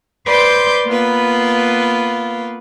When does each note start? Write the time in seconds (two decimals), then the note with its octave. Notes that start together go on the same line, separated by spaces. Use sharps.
0.26 B4 C5 D5 C6 D6 G6
0.86 A#3 B3 F4 B4